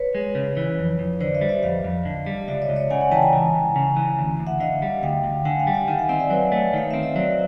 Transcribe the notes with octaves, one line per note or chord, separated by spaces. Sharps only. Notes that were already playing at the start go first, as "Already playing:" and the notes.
Already playing: B4 C#5
G#3
C#3
E3
F2
F2
D3 C5 D5
D5 E5
G3
D5 E5
F2 D#5 F5
F2
D3
G3
C#2 D5 E5
C#5 D#5
C#2
C#5 D#5
C#3 F#5 G#5
F#5 G#5
E3 G5 A5
G#5 A#5
C#2 G#5 A#5
C#2
C#3
E3
D2
D2
E5 F#5
D3 D#5 F5
G3
D2 F5 G5
D2
D3 F#5 G#5
F5 G5
G3
F5 G5
D#3 F#5 G#5
E5 F#5
C4 D#5 F5
D5 E5
F#3 B4 C#5
A3
D#3 F5
C4 E5
D#5
F#3 C5 D5